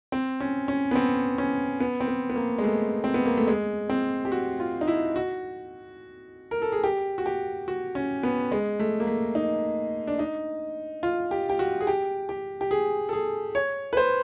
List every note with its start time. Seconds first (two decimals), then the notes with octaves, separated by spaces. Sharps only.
0.12 C4
0.40 C#4
0.68 C#4
0.91 B3
0.95 C4
1.38 C#4
1.80 B3
2.00 C4
2.08 B3
2.30 B3
2.36 A#3
2.58 G#3
2.64 A3
3.04 C4
3.14 B3
3.26 A#3
3.37 A3
3.47 G#3
3.89 C4
4.25 G4
4.32 F#4
4.60 F4
4.81 D#4
4.88 E4
5.16 F#4
6.51 A#4
6.62 A4
6.72 G#4
6.84 G4
7.18 F#4
7.26 G4
7.68 F#4
7.95 C#4
8.23 B3
8.52 G#3
8.80 A3
9.00 A#3
9.07 A3
9.35 D#4
10.07 D4
10.19 D#4
11.03 F4
11.31 G4
11.50 G4
11.59 F#4
11.81 G#4
11.87 G4
12.29 G4
12.61 G4
12.71 G#4
13.09 A4
13.13 G#4
13.55 C#5
13.93 B4
13.97 C5